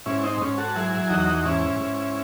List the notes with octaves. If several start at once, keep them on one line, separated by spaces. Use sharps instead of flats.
G#2 C#4 E4
C4 D#4
G#2 C#4
F#4 A4
F#3 E4 G#4
E2 D#4 F#4
G#2 C#4 E4
G#2